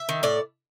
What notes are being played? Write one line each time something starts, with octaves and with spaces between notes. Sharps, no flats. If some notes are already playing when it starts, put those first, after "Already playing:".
Already playing: E5
D#3
A2 D5